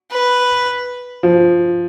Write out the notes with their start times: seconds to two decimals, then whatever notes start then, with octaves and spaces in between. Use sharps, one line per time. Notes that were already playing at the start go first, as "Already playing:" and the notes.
0.11 B4
1.23 F3